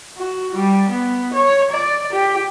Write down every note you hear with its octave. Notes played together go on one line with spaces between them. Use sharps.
F#4
G3
B3
C#5
D5
G4